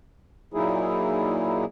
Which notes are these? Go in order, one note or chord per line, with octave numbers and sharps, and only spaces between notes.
A#2 F#3 A#3 D#4 E4 G#4